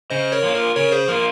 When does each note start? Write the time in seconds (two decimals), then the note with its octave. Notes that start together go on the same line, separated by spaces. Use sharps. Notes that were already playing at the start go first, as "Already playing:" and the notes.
0.10 C#3 C5 D#5
0.32 A#4 C#5
0.43 F3 A#3 F4
0.54 A#4
0.76 C#3 A#4 C#5
0.92 G#4 C5
1.08 F3 A#3 F4 A#4